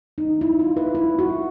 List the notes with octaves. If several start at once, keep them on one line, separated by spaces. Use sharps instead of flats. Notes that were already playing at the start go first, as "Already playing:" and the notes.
D#4
E4
F4
B4
E4
F#4